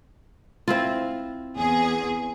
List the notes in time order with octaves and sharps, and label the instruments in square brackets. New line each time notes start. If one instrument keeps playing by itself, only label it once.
[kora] C4 E4 F4
[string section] E2 G#4